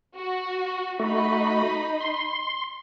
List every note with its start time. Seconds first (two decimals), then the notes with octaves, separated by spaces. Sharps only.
0.15 F#4
1.00 A3 D#4 F#4 D#5 B5
2.01 C6